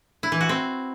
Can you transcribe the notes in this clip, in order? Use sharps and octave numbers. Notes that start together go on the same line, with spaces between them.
E4
E3
F#4
C4